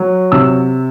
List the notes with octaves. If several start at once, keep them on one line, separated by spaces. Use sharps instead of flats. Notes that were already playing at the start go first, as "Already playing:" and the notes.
Already playing: F#3
C3 E6